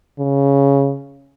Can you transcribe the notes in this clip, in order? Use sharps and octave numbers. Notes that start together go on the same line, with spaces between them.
C#3